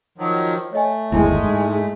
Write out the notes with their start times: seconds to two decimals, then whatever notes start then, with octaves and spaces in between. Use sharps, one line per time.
0.18 D#3 F3 F#3
0.73 A3 C#5 D#5 G#5
1.12 G1 D#2 G#3 E4 G5
1.43 G#2